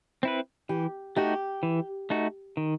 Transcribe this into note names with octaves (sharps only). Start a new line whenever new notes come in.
C4 E4 B4
E3 G4
A3 D#4 F#4 G4
E3
A3 D#4 F#4
D#3